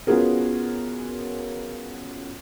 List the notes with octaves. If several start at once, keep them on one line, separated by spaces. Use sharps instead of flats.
B3 C#4 F4 F#4 G#4 A#4